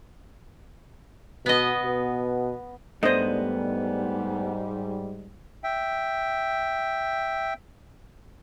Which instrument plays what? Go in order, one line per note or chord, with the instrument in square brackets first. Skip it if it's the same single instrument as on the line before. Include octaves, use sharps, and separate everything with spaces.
[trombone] B2 [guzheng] B3 D#5
[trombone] B2
[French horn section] G#2 G3 [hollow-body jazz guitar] A3 B3 D4 [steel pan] C5 D#5
[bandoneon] E5 G5